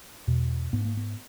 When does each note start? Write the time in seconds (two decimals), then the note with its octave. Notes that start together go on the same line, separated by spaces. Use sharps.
0.27 E2 B2
0.73 G#2 B3
0.85 A#3
0.97 B3